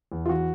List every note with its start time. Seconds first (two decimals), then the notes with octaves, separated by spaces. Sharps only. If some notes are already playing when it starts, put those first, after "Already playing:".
0.12 E2
0.26 F4
0.29 E3 F#4